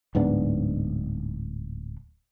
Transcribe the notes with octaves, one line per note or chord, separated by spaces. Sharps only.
D1 G#2 B3 D4